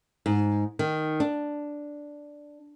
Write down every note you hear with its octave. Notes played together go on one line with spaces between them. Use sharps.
G#2
D#3
D4